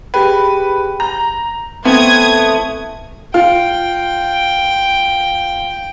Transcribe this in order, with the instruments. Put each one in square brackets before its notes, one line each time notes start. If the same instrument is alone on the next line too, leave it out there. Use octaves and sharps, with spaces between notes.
[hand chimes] G4 G#4 G5 [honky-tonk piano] B4
[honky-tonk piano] A#5 [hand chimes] G6
[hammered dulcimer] E3 A3 C4 [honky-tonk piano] B3 [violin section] D#6 G#6
[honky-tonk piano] F4 [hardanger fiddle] G5